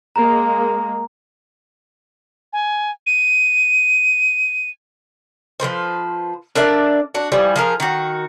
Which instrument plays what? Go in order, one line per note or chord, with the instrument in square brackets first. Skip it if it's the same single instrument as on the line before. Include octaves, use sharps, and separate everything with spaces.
[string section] G#3 A#3 [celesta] A#5
[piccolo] G#5
D#7
[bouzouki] F3 G#3 B4 C5
D4 A#4 D5 E5
D4 F#4
E3 F3 G3
F3 G#4 A#4
D#3 F#4